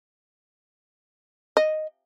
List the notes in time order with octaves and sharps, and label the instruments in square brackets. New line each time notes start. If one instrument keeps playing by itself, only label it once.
[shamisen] D#5